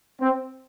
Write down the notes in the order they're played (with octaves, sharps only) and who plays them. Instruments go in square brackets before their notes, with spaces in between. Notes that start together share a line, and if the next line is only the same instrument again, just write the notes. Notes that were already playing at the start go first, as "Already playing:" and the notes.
[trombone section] C4